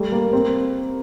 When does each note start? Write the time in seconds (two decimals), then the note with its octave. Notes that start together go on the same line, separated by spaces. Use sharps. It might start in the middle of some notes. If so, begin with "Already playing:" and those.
Already playing: G3 A3
0.12 A#3
0.33 C4